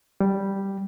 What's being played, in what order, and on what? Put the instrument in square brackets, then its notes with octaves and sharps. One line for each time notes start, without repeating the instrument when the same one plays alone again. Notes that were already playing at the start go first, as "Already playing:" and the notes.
[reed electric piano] G3